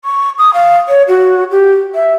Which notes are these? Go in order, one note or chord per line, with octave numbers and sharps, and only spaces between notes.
C#6
D#6
F5
C#5
F#4
G4
E5